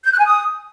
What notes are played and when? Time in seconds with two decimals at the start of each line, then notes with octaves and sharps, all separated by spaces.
0.04 G6
0.11 F#6
0.18 G#5
0.25 D#6